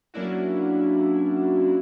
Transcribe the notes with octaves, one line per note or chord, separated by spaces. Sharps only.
F#3 A#3 C#4 D4 E4 F#4